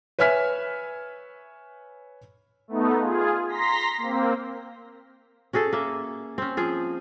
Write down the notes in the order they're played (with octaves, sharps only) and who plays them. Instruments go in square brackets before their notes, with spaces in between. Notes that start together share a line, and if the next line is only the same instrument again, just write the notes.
[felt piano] B4 C#5 E5 G#5 F6 B6
[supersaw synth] A3 B3 D#4
F4 G#4
A#5 C6 A#6 B6
A#3 C4
[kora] C#4 F#4 G#4 A4
A#3 E5
C4 C#4
F3 F4 G#4